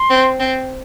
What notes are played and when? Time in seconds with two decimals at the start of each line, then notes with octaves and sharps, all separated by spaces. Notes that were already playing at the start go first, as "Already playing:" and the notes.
Already playing: C6
0.10 C4
0.40 C4